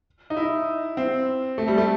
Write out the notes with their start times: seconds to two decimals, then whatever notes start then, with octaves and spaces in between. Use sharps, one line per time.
0.30 D#4
0.37 E4
0.97 C4
1.58 A3
1.68 G3
1.78 A3